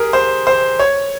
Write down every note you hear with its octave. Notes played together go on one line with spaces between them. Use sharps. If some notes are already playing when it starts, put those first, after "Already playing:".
Already playing: G4 G#4 A#4
C5
C5
C#5